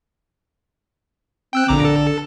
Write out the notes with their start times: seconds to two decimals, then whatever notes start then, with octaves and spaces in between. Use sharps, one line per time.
1.53 C4 G5 E6 F#6
1.68 A#1 D3 A#5 D6
1.85 A4